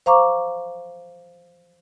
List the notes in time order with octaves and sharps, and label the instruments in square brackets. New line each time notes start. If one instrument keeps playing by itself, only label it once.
[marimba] C5 F5 A#5 C#6 D6